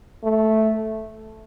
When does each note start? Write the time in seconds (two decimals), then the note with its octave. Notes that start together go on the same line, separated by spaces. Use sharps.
0.23 A3